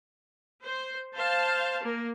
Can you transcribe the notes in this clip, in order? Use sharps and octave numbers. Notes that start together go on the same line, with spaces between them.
C5
C5 F5 A5
A#3